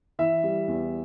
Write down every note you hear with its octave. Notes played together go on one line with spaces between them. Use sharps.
E3 E5
G3
E2